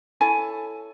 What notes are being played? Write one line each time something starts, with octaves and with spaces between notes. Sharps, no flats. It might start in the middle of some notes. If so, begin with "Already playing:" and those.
E4 A4 C#5 G#5